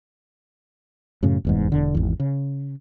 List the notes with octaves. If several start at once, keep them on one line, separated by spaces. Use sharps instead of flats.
F#2 A2 C#3
F1 E2 G#2
E1 D3
G#1 E2
C#3